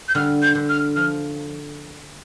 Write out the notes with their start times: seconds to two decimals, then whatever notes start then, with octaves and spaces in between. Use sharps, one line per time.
0.08 G6
0.15 D3 G3 F6
0.42 G6
0.55 D3
0.69 F6
0.96 F3 F6